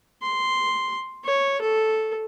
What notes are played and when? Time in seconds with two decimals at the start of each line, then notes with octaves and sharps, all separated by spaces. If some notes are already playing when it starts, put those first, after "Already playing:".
0.23 C6
1.24 C#5
1.61 A4